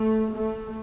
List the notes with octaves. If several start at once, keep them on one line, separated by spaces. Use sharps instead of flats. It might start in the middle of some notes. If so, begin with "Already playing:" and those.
Already playing: A3
A3